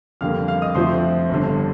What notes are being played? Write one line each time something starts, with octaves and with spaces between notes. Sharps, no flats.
F2 D3 G3 A#3 F5 F6
F5 F6
D#5 D#6
F2 D3 F3 A3 C5 C6
G1 G2 D3